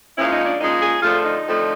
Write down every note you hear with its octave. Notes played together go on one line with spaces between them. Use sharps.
A#2 F3 G#3 C#4 E4
D#4
D4
A#2 F3 G#3 C#4 D#4
G#4
F2 D3 F3 A3 F4
D#4
F2 D3 F3 A3